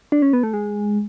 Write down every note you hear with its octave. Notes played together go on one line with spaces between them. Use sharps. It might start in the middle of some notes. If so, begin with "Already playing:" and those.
D4
C#4
B3
A3
G#3